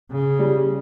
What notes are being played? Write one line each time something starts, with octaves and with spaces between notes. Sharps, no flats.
C#3
G3